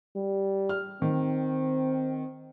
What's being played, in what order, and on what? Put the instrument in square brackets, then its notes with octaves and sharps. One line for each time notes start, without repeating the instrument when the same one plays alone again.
[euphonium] G3
[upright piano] F6
[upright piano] D#3 [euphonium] C4